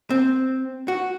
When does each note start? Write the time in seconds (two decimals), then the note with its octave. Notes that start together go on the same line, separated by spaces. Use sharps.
0.10 C4
0.88 F#4